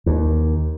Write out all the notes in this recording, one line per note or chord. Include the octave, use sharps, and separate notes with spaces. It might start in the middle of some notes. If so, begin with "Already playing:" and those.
D#2